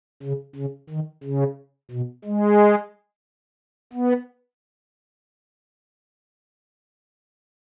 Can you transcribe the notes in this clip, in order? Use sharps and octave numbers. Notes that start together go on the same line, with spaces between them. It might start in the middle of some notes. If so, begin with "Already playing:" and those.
C#3
C#3
D#3
C#3
B2
G#3
B3